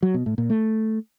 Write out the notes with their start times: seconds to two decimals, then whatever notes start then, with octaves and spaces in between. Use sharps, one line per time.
0.03 F#3
0.14 B2
0.26 A2
0.38 A#2
0.50 A3